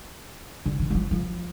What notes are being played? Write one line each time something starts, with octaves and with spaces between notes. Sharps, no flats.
D3
D#3
G3
F3
F3